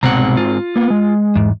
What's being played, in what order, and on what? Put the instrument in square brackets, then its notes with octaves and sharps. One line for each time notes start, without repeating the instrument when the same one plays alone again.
[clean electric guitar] C2 B2 F#5 [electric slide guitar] G#2 C4 A#5
[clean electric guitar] F4
[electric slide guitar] A#3 B3
G#3
[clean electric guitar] E2 G#2